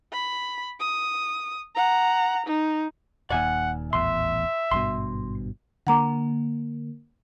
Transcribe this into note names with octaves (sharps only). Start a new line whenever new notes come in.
B5
D#6
F#5 A#5
D#4
D#1 D#2 D5 E5 F#5 G#5
D#1 A1 E2 E5 C6
G#1 G2 B2 C6
D3 A#3 F#5 A#5 D6